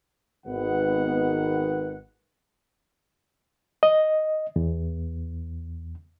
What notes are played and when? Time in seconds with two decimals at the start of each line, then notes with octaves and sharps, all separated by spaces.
0.47 G#1 D#3 B3 F#5
3.83 D#5
4.56 E2